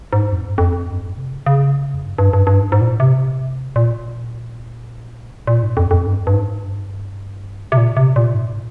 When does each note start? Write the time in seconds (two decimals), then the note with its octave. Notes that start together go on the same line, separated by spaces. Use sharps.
0.13 G#2
0.32 F2
0.46 G2
0.58 F2
0.89 G2
1.03 G#2
1.18 C3
1.32 C#3
1.46 C#3
1.94 F2
2.05 G2
2.18 G2
2.33 G2
2.47 G2
2.62 G#2
2.72 G#2
2.81 A#2
3.00 C3
3.76 A#2
5.47 A#2
5.63 G#2
5.77 F2
5.91 F2
6.06 G2
6.27 G2
6.34 G#2
6.62 G2
7.72 C3
7.77 A#2
7.97 C3
8.16 A#2
8.34 G#2